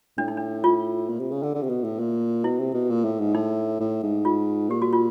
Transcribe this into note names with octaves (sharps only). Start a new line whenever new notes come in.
A2 D4
D#4
D4
F4
A#2
C3
C#3
D3
D3
C3
B2
A2
A#2
B2 E4
C3
B2
A#2
A2
G#2
A2 D#4
A2
G#2
F4
A#2 G4
F#4
F4